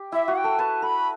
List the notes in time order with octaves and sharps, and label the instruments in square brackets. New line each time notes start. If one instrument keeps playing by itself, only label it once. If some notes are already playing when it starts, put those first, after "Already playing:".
Already playing: [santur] G4
[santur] E4 [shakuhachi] E5
[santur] F#4
[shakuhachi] G5
[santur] A4
[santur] B4 [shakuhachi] A5
[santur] A4 [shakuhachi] B5